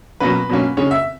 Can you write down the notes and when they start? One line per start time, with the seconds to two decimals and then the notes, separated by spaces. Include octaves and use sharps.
0.20 B2 F#3 A#3 C#4 B4
0.49 B2 F#3 A#3 C#4
0.77 C#3 G#3 C#4 C#5
0.91 E5